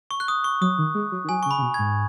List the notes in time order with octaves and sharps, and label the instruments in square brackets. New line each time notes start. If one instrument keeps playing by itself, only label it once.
[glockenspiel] C#6
F#6
D#6
C#6
[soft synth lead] F#3 [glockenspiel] D#6
[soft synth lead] D#3
G#3
F#3
D#3
[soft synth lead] F#3 [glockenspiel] G#5
[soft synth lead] C#3 [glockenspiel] C#6
[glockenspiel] B5
[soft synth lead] C#3
B2
[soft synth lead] G#2 [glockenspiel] G#6